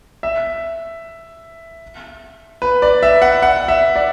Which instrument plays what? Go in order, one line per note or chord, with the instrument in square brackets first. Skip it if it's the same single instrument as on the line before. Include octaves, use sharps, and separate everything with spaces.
[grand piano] E5
B4
D5
E5
F#5
F#5
E5
D5